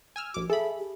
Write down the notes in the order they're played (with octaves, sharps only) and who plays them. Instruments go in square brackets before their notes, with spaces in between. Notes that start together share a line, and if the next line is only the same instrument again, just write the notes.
[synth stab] G#5 E6 F6
[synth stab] A#1 D6 [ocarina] F#4
[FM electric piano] G#4 [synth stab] A4 B5 [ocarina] E5
[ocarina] G4